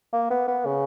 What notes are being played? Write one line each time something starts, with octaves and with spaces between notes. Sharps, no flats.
A#3
B3
B3
C#3